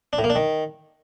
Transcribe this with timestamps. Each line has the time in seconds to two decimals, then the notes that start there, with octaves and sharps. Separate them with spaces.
0.13 D4
0.18 A2
0.24 A#3
0.30 D4
0.35 D#3